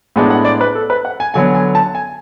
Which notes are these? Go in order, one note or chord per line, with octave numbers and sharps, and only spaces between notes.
A2 G#3 B3 D4
F#5
D5
B4
A4
B4
F#5
G#5
D3 F#3 B3 G#5
G#5
A5
G#5